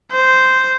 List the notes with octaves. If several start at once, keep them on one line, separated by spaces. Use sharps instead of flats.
C5